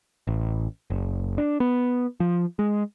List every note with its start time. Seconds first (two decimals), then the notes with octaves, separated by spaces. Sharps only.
0.27 A1
0.90 F#1
1.38 D4
1.60 B3
2.20 F3
2.59 G#3